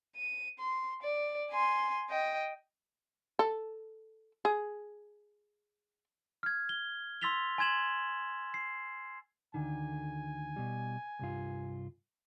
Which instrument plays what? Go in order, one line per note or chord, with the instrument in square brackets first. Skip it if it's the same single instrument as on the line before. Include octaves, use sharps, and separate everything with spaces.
[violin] D#7
C6
D5
G#5 C6
D#5 G5
[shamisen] A4
G#4
[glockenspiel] F6 G#6
G7
C6 E6 A6 B6 F7 G7
G#5 C6 G#6 E7 F#7
C7
[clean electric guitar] D2 D3 D#3 [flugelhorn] G#5
[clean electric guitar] B2 G3
C2 G2 F4